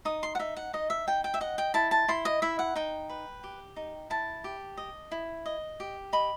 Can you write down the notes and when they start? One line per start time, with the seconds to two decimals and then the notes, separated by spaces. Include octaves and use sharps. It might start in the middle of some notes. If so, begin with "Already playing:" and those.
0.05 D#4 D#6
0.23 C6
0.35 F#5
0.39 D#4 E5
0.56 F#5
0.73 D#4 D#5
0.90 E5
1.07 D#4 G5
1.24 G5
1.34 E5
1.41 D#5 F#5
1.58 G5
1.74 E4 A5
1.91 A5
2.08 E4 C6
2.25 D#5
2.42 E4 E5
2.59 F#5
2.75 D#4 G5
3.09 B4
3.44 G4
3.76 D#4
4.10 E4 A5
4.44 G4
4.77 D#5
5.11 E4
5.46 D#5
5.80 G4
6.13 D#5 B5